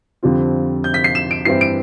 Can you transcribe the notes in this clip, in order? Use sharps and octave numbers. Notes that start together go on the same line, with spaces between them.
F2 D3 G3 C4 F4
G6
B6
C7
E7
D7
G2 E3 G3 C4 E4 C7
D7